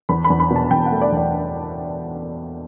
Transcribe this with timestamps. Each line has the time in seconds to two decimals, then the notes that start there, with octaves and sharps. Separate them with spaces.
0.09 E2 B5
0.24 B5
0.30 E2
0.40 B5
0.50 B2
0.56 A5
0.71 E2 G5
0.86 F#5
0.92 A3
1.02 D5
1.12 E2 D5